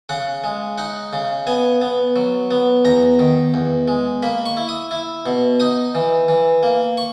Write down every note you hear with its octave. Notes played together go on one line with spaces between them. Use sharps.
C#3 F#5
G#3
D#4 F#5
C#3
B3 G#5
B3
F#3
B3
E2 A#5
D#3
E2
G#3
A#3 B5
C#6
E4
D#6
E4
B2
D#4 D#6
E3
E3
A#3
C#6